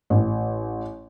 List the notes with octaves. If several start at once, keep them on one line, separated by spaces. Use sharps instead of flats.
A1